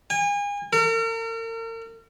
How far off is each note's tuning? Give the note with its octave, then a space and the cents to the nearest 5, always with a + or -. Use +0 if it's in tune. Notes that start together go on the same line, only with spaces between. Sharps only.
G#5 -35
A#4 -40